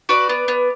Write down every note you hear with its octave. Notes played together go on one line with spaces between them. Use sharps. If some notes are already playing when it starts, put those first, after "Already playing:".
F#4 B4 D5
B3
B3